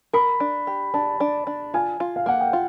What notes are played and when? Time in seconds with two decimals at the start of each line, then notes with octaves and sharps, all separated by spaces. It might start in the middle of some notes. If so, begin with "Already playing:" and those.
0.13 A#4 B5
0.40 D4
0.67 G4
0.94 D4 A5
1.20 D4
1.47 D4
1.74 F4 G#5
2.00 F4
2.16 F5
2.26 A#3 F#5
2.40 G5
2.53 F4